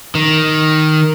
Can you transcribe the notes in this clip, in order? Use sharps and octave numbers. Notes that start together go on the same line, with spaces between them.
D#3